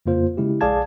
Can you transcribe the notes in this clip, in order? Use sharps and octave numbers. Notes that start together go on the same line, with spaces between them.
F2 C#3 A#3 F4 C5
C#3 G#3 E4 G4
A#1 G#4 D5 F5 A5 G#6